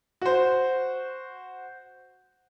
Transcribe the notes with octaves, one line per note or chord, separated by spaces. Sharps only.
F#4 C5